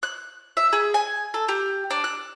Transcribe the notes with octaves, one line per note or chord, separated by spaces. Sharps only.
F#6
E5
G#4
G#5
A4
G4
D4
F#6